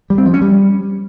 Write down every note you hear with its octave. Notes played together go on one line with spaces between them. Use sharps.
G3
C4
F3
C#4
G3